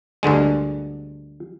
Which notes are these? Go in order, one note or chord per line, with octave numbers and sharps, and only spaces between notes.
D2 G2 D3 G#3